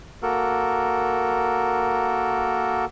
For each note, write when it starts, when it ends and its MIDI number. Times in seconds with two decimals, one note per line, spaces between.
0.23 2.85 58
0.23 2.85 66
0.23 2.85 69
0.23 2.85 70